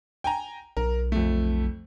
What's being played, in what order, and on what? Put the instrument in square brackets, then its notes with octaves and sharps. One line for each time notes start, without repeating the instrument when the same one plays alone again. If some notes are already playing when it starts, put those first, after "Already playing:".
[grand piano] G5 G#5 A#5
[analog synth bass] B1 [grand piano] A#4
[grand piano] F2 A3